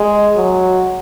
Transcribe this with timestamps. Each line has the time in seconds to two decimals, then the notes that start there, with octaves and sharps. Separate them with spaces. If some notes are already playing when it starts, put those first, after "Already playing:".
Already playing: G#3
0.36 F#3